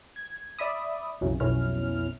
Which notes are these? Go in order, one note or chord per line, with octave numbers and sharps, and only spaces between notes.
G#6
D5 E5 B5 D#6
B1 F2 C#3 E3 F#3
B1 F2 B2 C#4 E4 F6